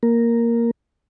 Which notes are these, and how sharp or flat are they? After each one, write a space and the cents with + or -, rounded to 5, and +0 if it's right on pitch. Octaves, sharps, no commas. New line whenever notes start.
A#3 +0 A#4 +0